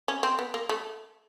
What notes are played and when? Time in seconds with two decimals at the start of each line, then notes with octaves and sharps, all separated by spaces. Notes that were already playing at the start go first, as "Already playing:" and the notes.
0.08 C#4
0.23 C4
0.39 B3
0.54 A#3
0.69 A3